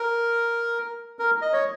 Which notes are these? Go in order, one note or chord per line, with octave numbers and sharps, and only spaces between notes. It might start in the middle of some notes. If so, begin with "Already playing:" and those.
Already playing: A#4
A#4
D#5
C#5